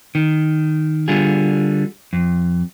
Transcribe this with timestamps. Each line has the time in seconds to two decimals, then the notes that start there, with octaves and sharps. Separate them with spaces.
0.15 D#3
1.08 D3 G3 F4 G#4
2.13 F2